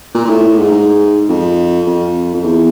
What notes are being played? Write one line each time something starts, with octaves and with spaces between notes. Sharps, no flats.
A#2
A#2
A2
A2
G#2
G#2
F2
F2
F2
E2